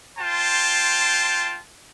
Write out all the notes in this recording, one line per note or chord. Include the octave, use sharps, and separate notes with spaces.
F4 C5 G5 A5